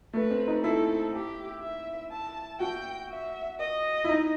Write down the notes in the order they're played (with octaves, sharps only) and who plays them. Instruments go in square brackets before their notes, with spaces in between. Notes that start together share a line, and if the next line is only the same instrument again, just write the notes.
[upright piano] A3 [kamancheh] B4
[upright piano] C4
D#4
[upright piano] E4 [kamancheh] A4
[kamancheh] G4
E5
A5
[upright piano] F#4 [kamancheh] G5
[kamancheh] E5
D#5
[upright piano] E4
D#4